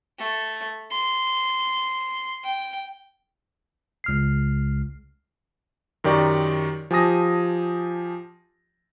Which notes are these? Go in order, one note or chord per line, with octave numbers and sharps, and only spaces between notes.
A3
C6
G5
C#2 F6 C7
F#2 D#3 G4 D5 A#5 C#6
F3 G4 G#5 A5 D#6 A#6